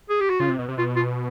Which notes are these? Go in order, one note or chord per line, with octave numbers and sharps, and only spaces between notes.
G#4
G4
F#4
C#3 F4
C3
B2
C3
B2 F4
F4